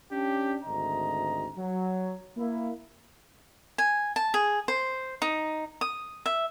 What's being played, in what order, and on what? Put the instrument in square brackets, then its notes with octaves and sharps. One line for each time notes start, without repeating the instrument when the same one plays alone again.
[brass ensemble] C#4 D4 G4
G#1 D2 D#5 A#5
F#3
A#3 E4
[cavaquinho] G#5
A5
G#4
C5
D#4
D#6
E5